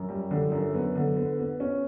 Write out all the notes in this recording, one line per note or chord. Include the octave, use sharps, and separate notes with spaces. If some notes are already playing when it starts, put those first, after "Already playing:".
Already playing: F#2
G3
D3
F#2
B3
D3
B3
B3
C#4